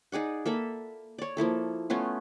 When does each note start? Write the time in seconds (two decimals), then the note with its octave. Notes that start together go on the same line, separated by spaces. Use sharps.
0.12 D#4 G#4 D5 F#5
0.46 A#3 A4 E5 B5
1.18 C#5 D5
1.37 F3 A#3 E4 A4
1.90 A3 B3 C#4 F4